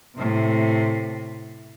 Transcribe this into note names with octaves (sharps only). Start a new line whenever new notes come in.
A2 C3